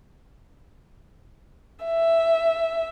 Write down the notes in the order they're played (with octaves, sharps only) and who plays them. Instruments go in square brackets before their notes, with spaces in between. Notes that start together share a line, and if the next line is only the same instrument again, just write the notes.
[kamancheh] E5